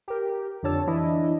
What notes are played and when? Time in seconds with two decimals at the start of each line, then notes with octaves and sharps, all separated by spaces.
0.08 G4 A#4
0.63 F2 D3 D4 C#5 A5 E6
0.87 E3 D4 E4 D#5